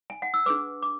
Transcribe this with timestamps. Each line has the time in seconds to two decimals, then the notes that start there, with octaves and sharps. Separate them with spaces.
0.10 G#5
0.22 F#5
0.34 E6
0.46 D4 G#4 B4 D6
0.83 D6